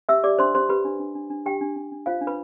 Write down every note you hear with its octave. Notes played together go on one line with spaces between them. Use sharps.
G4 E5 E6
G4 D5 D6
D4 C5 C6
G4 C5 C6
G4 B4 B5
D4
D4
D4
D4
D4 G4 G5
D4
D4
D4
F4 C5 F5
D4
B4 B5